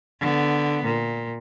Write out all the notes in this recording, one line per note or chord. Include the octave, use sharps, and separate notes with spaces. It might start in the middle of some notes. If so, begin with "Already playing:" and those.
D3 B3
A#2